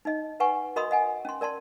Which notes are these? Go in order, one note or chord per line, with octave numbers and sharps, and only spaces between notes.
D#4 D#5
B4 F#5 G#5 C#6
F#4 A#4 D#5 B5 C6 D#6
D#5 F#5 G#5
C#4 C6
A#4 D5 A5 C6